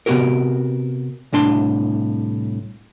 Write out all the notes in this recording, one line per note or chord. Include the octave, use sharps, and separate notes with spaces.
C3 B3 C4 F#4 G4 A#4
C2 A2 D4 C6